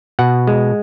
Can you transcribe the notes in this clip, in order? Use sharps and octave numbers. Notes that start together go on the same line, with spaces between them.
B2 F#5
G#3